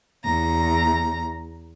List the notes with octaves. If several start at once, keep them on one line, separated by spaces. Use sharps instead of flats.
E2 A#5